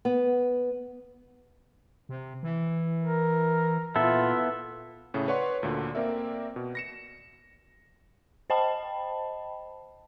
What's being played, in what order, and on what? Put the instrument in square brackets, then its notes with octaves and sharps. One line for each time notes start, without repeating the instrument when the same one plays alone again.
[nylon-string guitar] B3
[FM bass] C3
E3
[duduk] A#4
[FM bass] A#2 [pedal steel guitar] B3 E4 A4 [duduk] F4 [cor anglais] E5
[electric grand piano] A2 C#3 A3
B4 C#5 D5 F#5 C6 C#6
D2 A#2 D3
A#3 C4 A#4 D5 E5
B2
A#6 C#7 E7
[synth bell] C5 D#5 G5 A5 B5